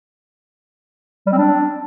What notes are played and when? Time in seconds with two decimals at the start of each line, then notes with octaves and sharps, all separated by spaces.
1.26 G3
1.32 C4
1.38 D4